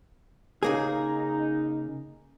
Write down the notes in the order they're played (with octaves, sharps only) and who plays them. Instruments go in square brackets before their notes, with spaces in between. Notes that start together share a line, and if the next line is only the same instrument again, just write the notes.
[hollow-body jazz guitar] C#3 A#3 G#4 [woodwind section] D#4